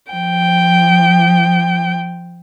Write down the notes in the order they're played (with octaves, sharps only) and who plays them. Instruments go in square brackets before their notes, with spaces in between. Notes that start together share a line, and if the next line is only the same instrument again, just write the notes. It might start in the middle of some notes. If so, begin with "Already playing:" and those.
[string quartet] F3 G5